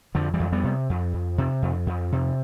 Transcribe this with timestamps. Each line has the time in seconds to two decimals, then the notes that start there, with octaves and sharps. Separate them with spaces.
0.15 F2 D3 F3
0.34 E3 G3
0.40 F2
0.52 G3 B3
0.64 C3
0.89 F2
1.14 F2
1.38 C3
1.62 F2
1.87 F2
2.12 C3